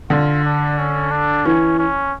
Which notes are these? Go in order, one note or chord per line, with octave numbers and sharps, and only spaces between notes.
D3 F4
D4
C#4
D4
E3 C#4
C#4